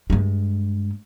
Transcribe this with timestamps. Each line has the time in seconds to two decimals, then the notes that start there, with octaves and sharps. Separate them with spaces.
0.10 G2 G#3